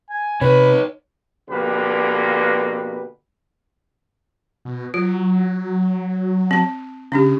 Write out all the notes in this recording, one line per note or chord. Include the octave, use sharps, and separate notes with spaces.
G#5
C3 D#4 B4 C#5 B5
F2 B2 D3 A#3 G4 B4
B2
F#3 F4
C4 A5
C#3 C#4 D4 G4